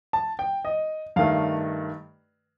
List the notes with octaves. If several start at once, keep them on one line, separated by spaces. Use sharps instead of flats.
A5
G5
D#5
G2 D#3 A3 F5